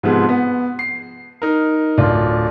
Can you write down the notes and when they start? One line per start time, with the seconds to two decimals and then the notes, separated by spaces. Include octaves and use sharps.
0.03 G#2 C3 F3 G#3 B3
0.29 B3
0.79 C7
1.42 D#4 A#4
1.97 D1 F4 D5